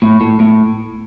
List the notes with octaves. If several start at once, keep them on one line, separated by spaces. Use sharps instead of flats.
A2
A2
A2